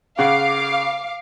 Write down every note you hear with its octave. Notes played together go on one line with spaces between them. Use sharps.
C#3 F5 F#5 D6